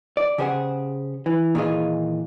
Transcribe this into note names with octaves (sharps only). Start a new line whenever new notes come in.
D5
C#3 G4 G#4 C5 E5 F#5
E3
A#2 D#3 E3 F4 G#4 D#5